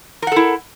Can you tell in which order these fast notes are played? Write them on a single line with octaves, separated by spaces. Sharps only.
A#4 F#5 A4 E4